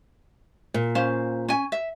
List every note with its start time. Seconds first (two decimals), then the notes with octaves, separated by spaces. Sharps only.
0.74 A#2
0.95 C#4 C5 F5
1.48 C#4 G#5
1.72 E5